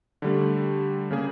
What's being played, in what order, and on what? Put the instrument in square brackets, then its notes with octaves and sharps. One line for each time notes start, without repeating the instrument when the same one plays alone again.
[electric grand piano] D3 G3 A3
C#3 A#3 G#4